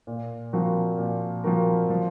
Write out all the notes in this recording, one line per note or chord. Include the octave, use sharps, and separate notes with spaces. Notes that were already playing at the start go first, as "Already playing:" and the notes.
A#2
F3 C4 F#4 A#4
A#2
F3 C4 F#4 A#4
F3